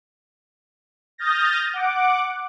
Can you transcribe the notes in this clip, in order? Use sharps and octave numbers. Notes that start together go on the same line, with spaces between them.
D#6 F6 G6 A6 A#6
F#5 D6